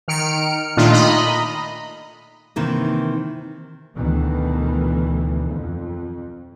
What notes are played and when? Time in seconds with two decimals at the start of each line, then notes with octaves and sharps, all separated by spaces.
0.08 D#3 F6 C#7 D7
0.77 A#2 D#3 A3 D4 D#4 F4
0.92 D#5 A#5 B5
2.56 C3 D#3 E3 A#3
3.95 D2 B2 D#3 E3
5.49 F2